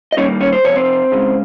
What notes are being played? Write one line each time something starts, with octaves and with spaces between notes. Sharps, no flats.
D#5
G2 D#3 G3 A#3 C#4 C#5
C#4 C#5
C5
F2 C3 F3 C#5
C4 C5
C#2 C#3 G#3